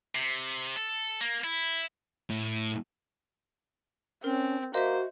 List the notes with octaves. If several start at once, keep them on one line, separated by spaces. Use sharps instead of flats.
C3
A4
A#3
E4
A2
C4 C#4 A#4
A#3 F#4 C5 D#5 E5